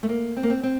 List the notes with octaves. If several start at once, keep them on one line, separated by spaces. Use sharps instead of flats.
A3
A#3
C4
A#3
C4
C4